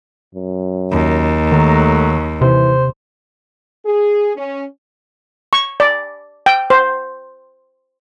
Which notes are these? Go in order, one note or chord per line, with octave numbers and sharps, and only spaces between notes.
F#2
D#2
D#3 F#3 A3
C3 E3 C5
G#4
C#4
C#6
D5
G5
C5